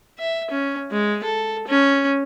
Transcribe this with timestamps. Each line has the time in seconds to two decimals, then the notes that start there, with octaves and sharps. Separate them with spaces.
0.18 E5
0.50 C#4
0.91 G#3
1.23 A4
1.67 C#4